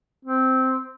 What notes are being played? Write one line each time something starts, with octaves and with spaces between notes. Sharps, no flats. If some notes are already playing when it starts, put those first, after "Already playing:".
C4